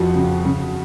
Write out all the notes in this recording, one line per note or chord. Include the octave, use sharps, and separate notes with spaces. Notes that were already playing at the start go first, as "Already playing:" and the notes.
Already playing: F2 F3 F#4
C#3
C#3